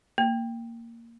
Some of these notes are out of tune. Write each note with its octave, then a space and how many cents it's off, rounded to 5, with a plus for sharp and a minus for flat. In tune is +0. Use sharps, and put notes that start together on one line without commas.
A#3 -10